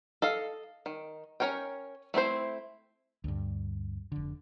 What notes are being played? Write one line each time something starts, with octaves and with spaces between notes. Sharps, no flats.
A4 D#5 F5
D#3
C#4 D#4 A#4 C#5 G5
A3 C4 E4 C5
D2 G2
F1 D3